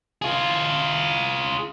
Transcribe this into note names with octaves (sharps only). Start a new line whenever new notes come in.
F4 G#4